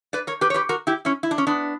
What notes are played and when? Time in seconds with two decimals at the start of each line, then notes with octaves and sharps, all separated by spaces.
0.13 B4 D5
0.27 A#4 C#5
0.41 G4 B4
0.50 C#5
0.54 G4 B4
0.69 F#4 A#4
0.87 E4 G4
1.05 C#4 E4
1.23 E4
1.31 D4
1.38 C#4
1.47 B3 D4